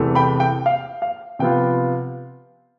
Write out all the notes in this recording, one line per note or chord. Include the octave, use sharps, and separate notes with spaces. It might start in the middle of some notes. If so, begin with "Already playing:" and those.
Already playing: E2 C3 E3 A3
G5 B5
G5
F5
F5
C3 F3 B3 F4 G5